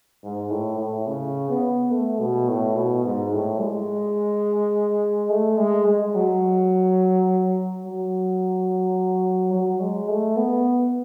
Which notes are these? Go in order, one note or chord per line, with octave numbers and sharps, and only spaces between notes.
G#2
A2
A2
C#3
B3
A3
B2
A2
B2
G#2
A2
G#3
A3
G#3
G#3
F#3
F#3
F#3
G#3
A3
B3